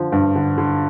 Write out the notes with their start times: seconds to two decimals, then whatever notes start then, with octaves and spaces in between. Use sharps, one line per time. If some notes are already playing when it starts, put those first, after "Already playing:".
Already playing: D3 F3
0.12 G2
0.36 D3
0.58 D3